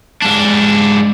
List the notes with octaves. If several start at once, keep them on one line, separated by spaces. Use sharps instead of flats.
G#2 D4